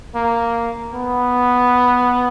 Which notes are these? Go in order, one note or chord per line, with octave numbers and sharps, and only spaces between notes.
A#3
B3